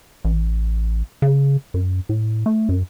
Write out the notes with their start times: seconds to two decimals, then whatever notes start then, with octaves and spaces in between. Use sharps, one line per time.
0.25 A1
1.22 C#3
1.74 F#2
2.09 A2
2.46 A3
2.69 F#2